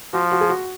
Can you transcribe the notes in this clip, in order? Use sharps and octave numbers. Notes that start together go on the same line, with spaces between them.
F3 F#4
F#4
G#4
F#4